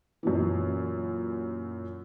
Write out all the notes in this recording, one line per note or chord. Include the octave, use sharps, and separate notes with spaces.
F#2 A#2 E3